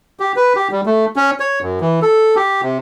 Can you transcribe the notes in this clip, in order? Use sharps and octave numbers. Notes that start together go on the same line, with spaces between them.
G4
B4
G4
G3
A3
C#4
C#5
F#2
E3
A4
G4
C3